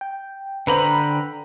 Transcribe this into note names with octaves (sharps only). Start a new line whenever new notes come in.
G5
D3 B4 C5 G5 A#5 B5